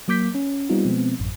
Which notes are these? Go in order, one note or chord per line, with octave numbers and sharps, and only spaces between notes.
F#3 A#3 D6 G6 B6
C#4
G3 B3 C4 D#4 F4
B2 F3 G#3 B3 C4
A1 F#2